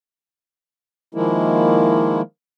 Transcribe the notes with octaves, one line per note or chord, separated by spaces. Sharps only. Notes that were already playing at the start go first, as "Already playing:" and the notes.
D#3 F3 G#3 A#3 E4